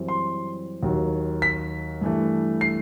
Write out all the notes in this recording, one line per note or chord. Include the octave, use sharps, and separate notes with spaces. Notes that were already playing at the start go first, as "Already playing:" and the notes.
Already playing: F#2 E3 G3 C4
C6
D#2 D#3 F#3
B6
G2 E3 A3
C7